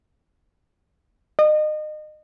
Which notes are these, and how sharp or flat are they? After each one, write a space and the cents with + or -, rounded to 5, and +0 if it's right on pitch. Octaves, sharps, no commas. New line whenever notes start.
D#5 -30